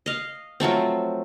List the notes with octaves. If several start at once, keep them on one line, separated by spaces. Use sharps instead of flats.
D#5 F5
F3 F#3 A3 C4